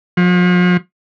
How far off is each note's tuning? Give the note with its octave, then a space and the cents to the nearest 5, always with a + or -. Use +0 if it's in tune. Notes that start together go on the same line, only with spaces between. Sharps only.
F3 +40